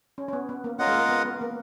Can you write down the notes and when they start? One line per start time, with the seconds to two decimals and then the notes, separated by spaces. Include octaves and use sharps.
0.18 C#4
0.28 C#4
0.33 B3
0.49 B3
0.64 A#3
0.79 C#4 F4 A#4 D#5 F#5
0.87 G#3
0.95 A#3
1.09 B3
1.25 B3
1.41 A#3